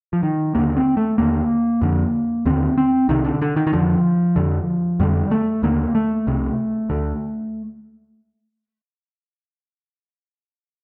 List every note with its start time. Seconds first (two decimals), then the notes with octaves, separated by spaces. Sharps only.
0.13 F3
0.23 D#3
0.55 D#2 D3 A#3
0.77 C4
0.97 A3
1.18 D#2 D3 A#3
1.82 F2 D3
2.46 D#2 D3 C4
2.78 C4
3.09 C2 C3 D#3
3.25 D3
3.42 D3
3.56 D#3
3.67 D#3
3.73 F2 D3 F3
4.36 F2 D3
5.00 F2 D3 G3
5.31 A3
5.63 D#2 D3 A#3
5.95 A3
6.27 C2 C3
6.90 D2 D3